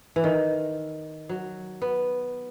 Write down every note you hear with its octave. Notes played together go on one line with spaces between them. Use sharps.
E3
D#3
F#3
B3